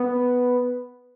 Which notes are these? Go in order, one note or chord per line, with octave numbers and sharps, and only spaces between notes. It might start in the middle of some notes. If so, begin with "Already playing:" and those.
Already playing: B3